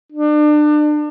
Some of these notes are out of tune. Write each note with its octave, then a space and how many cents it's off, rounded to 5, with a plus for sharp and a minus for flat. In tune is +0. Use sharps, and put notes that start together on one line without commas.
D4 +30